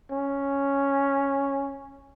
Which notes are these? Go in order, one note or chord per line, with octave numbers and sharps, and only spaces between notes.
C#4